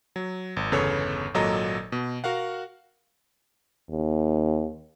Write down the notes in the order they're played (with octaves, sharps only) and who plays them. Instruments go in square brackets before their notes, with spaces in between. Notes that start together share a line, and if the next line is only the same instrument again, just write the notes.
[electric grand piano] F#3
G#1
G1 E2 C#3 A4 B4 C#5
G#1 A#2 F#3 A4 D#5 A#5
B2
F#4 A#4 F5 F#5
[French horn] D#2